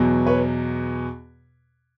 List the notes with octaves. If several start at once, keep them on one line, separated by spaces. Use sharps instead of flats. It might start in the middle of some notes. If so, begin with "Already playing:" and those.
Already playing: E2 B2 F#3
B4 C#5